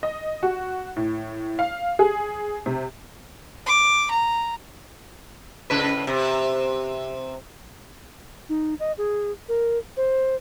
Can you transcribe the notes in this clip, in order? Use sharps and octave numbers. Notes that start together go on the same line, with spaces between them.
D#5
F#4
A2
F5
G#4
C3
D6
A#5
A2 C#3 B4
C3
D#4
D#5
G#4
A#4
C5